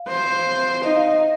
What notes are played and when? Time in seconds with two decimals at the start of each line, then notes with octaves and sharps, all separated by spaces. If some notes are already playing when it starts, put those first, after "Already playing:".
Already playing: F5
0.08 C5
0.84 D#4 D#5
0.96 F5
1.08 D#5